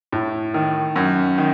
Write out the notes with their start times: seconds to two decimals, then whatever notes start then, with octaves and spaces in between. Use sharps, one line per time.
0.12 A2
0.54 D#3
0.96 F#2
1.38 D#3